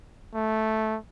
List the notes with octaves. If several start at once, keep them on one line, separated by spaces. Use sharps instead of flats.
A3